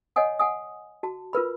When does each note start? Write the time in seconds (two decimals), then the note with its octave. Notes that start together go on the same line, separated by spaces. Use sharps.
0.16 C#5 D#5 F#5 G#5 D#6
0.39 F#5 G#5 D#6
1.03 F#4 A5
1.33 F4 A#4 B4 B5